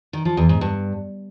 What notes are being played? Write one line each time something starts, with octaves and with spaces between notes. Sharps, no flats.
D#3
F3
E2
G#2
G2